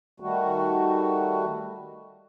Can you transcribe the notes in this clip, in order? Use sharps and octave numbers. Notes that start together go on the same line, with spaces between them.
D#3 G3 A3 F#4